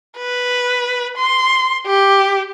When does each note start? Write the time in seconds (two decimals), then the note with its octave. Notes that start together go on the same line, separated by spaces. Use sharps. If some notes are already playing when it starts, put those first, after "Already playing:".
0.18 B4
1.18 C6
1.86 G4